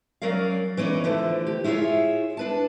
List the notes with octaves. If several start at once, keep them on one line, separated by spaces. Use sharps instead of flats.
F#3 C#4 A#4 D5 F5
E3 B3 C#4 D#4 D5
D3 E3 F3 A3
G4
E4 F4 G#4 A#4 C#5
D4 B4 A5